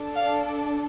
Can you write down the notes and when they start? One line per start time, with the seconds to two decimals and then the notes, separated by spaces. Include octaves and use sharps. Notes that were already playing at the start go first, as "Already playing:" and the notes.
Already playing: D4 A4
0.16 F5